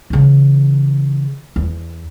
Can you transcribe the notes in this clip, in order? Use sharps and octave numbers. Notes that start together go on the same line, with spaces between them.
C#3 E3
E2